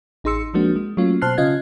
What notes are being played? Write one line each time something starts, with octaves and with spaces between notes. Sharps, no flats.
A1 D#4 G#4 C6 E6 C#7
F3 G#3 A#3 C4 D4 F#4
G#3
F#3 A3 A#3 C#4 F4
B2 C5 A5 F6 F#6 C7
C#3 C#4 F4 D#5 F5 G#6